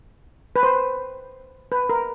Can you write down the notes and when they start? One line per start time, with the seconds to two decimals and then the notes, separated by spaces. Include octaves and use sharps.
0.56 B4
0.63 C5
1.72 B4
1.89 A#4